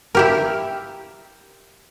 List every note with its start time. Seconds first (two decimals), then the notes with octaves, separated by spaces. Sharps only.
0.15 E4 G4 A#4